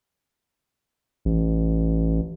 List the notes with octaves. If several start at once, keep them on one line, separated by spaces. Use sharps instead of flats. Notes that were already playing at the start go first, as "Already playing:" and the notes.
A1